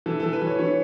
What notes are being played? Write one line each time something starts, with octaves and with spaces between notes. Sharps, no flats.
E3 A4
E3 A4
B4
E3 C#5
E3 C#5